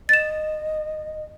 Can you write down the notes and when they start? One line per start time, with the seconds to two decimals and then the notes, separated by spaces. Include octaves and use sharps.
0.09 D#5 A6 E7